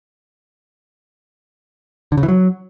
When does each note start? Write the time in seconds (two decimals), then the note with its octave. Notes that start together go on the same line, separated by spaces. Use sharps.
2.12 D3
2.17 C#3
2.23 E3
2.28 F#3